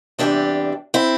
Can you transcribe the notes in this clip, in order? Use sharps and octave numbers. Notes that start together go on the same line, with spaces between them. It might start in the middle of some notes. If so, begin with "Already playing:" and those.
E2 C3 E3 G3 D4 G4
C4 E4